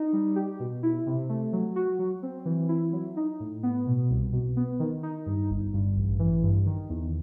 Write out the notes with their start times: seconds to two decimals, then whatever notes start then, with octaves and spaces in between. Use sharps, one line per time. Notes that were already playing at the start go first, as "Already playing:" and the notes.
Already playing: D#4
0.13 G3
0.36 G4
0.60 B2
0.83 E4
1.06 C3
1.29 A3
1.53 F#3
1.76 F#4
1.99 F#3
2.23 C4
2.45 E3
2.69 E4
2.93 F#3
3.17 D#4
3.40 A2
3.63 B3
3.87 B2
4.10 C2
4.33 B2
4.57 B3
4.80 D#3
5.03 D#4
5.26 G2
5.50 G1
5.73 G2
5.97 A1
6.19 E3
6.43 G2
6.66 D#3
6.89 E2